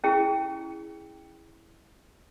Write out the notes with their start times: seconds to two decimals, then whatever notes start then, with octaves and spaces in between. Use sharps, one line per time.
0.04 C#4 E4 G#4